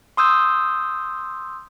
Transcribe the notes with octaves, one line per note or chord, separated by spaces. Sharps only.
C6 D#6 E6 G6